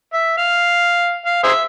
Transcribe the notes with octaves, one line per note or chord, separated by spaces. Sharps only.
E5
F5
F5
G#4 C5 E5